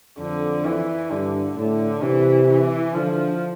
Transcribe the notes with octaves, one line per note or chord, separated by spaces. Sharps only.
F2 D3
E3
G2 D3
A2 D3
C3 E3
E3
D3 F3